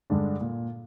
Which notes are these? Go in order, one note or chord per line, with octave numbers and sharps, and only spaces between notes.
G2 D3 G#3 D4
A#2